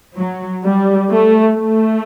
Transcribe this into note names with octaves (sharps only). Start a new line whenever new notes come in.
F#3
G3
A3
A3